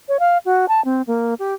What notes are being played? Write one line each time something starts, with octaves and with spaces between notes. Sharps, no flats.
C#5
F5
F#4
A5
C4
A#3
G4